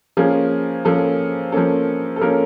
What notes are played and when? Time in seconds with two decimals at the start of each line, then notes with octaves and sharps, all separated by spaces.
0.17 F3 A#3 C#4 G#4
0.85 F3 A#3 C#4 A4
1.52 F3 A#3 C#4 A4
2.16 A4
2.21 F3 A#3 C#4 A#4